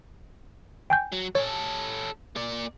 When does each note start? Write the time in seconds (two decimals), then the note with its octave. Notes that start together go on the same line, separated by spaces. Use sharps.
0.90 G5 G#5 G6
1.12 F#3
1.35 C#4 A4 C#5
2.36 A#3 D5